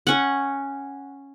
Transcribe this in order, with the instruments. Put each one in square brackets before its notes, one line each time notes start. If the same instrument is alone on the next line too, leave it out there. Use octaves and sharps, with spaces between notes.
[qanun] C#4 F#5